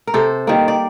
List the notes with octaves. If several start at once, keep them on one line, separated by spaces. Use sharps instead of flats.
A#4
C3 A4 C5
D#3 G3 A#3
D5